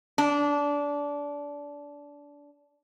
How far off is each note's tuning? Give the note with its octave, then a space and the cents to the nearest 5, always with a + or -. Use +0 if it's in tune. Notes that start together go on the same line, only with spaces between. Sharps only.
D4 -20